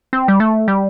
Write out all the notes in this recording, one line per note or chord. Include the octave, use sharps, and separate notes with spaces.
C4
G3
A3
G3